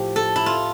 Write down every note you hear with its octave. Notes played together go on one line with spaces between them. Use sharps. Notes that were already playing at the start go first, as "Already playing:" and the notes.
Already playing: A2 F3 G4
A4
E4
F4